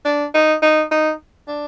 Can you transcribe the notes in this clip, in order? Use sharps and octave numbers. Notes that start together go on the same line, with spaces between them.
D4
D#4
D#4
D#4
D4